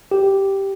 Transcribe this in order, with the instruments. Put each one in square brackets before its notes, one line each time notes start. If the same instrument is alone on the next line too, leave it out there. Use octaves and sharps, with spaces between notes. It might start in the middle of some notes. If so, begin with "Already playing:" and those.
[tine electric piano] G4